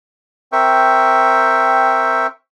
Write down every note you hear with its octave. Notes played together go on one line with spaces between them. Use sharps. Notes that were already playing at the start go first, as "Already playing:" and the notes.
C4 A#4 E5 G5 C#6